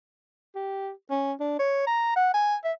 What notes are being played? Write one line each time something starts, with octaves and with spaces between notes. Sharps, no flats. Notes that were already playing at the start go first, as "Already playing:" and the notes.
G4
C#4
D4
C#5
A#5
F#5
G#5
E5